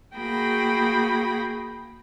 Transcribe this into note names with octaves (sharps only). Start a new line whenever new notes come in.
A#3 F#4 G#4 G5 B5 A#6